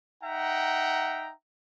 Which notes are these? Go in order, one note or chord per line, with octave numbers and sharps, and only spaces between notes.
D#4 E5 F#5 G5 A#5